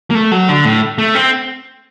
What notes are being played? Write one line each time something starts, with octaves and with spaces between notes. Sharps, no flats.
A#3
A3
F#3
D3
A2
A3
C4